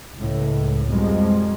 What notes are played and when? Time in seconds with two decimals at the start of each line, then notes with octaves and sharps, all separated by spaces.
0.17 C#2 A2
0.87 F2 B2 F3 G3 G#3 C4